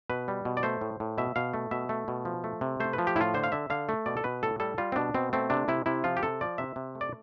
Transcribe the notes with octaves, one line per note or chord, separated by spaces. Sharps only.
B2 B4
G3
B2
D5
A3 C5
A2
A2
B2 E5
B2 F5
A3
B2 E5
A3
B2
F3
A3
C3
A3 C5
B4
F3
G4
A2 E4 F4
D3 C5
F5
D3 E5
D3 F5
A3
B2 D5
A4
B2 B4
A2 A4
G3 A4
G3 F4
C4
B2 D4
B2 C4
A3 C4
C3 D4
C3 E4
C3 E4
F3 F4
G4
C3 A4
F3 D5
C3 E5
C3
A3
D5